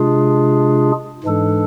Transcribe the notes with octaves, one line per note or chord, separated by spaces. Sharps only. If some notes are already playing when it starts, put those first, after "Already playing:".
Already playing: C3 G#3 D4 F4 G#4
G#2 E3 G#3 D4 A4